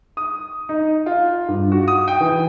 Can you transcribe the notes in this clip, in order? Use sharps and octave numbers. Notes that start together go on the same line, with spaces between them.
D#6
D#4
F4
G2
F#4
D#6
G5
E3